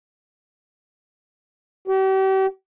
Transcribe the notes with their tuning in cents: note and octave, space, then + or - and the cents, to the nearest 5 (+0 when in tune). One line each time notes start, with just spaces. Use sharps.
G4 -40